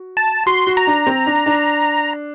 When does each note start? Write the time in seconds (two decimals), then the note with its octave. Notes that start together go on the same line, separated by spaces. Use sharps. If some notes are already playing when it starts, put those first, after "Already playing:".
Already playing: F#4
0.17 A5
0.46 F#4 C6
0.67 F#4
0.77 A#5
0.87 D4
1.07 C4
1.26 D4
1.46 D4